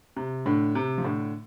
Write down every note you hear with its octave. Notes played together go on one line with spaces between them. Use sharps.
C3
A2 D3
C3
F3
A2 D3